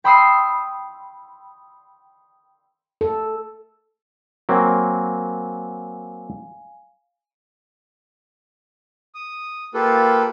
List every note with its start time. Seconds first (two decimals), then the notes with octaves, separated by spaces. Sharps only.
0.04 G5 B5 C6 D#6 E6 C7
3.01 A4
4.49 F#3 A#3 C4 F5 G#5
9.15 D#6
9.74 A#3 F4 G4 A4 B4